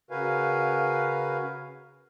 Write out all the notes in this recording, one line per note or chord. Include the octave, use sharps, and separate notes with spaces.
C#3 F#4 A#4 B4 F5 G#5